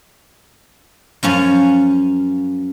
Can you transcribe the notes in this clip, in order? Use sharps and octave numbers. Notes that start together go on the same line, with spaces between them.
F#2 F3 C#4 G#5